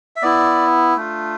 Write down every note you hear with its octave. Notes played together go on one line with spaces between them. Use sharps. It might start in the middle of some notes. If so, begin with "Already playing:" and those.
E5
B3 E4 D5
A3 D4 F4